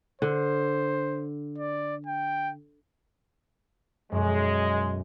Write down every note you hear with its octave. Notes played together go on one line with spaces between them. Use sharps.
D3 C5
D5
G5
B1 F#2 G#3